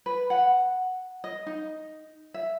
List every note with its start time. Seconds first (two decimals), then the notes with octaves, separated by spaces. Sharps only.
0.06 B4
0.30 F#5
1.24 D#5
1.46 D#4
2.34 E5